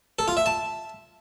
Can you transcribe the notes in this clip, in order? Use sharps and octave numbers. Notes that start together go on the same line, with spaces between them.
A4
F4
E5
A5